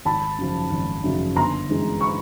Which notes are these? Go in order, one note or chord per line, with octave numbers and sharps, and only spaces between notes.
G#1 A5 B5
F#2 C#3 F3
G#1
F#2 C#3 F3
G1 A#5 C6
G2 E3 G#3 C#4
B5 C#6